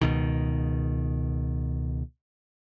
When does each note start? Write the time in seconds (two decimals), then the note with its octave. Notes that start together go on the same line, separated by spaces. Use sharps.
0.01 C#2 B2 D#3